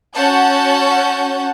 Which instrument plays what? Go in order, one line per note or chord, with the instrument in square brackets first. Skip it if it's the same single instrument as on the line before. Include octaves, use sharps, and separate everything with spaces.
[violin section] C#4 F#4 F#5 A5 G6